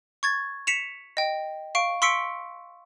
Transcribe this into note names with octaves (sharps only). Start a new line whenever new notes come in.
C#6 G#6 A6
B6 C#7 E7 F7
D#5 G5
F5 C#6 D7
C6 C#6 E6 B6 C#7 D7